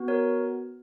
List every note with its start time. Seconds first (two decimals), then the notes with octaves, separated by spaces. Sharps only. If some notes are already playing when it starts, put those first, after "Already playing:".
Already playing: B3 F#4
0.08 A#4 C#5